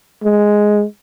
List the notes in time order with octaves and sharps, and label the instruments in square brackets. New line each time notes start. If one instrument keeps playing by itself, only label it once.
[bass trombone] G#3